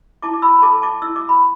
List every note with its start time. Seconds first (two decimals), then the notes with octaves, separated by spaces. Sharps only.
0.22 E4 A5 D6
0.33 D6
0.42 B5 E6
0.58 B5
0.62 A4 A5 D6
0.82 A5 D6
1.02 E4 E6
1.16 D6
1.29 B5